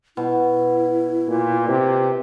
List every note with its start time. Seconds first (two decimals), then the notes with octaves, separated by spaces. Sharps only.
0.17 B2 E4
1.28 A#2
1.68 C3